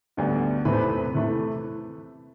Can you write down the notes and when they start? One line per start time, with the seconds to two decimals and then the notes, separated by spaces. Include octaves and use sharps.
0.17 D2 D3 G3 B3
0.65 E2 C3 E3 A3 C4 B4
0.73 C5
0.80 B4
1.15 C3 E3 A3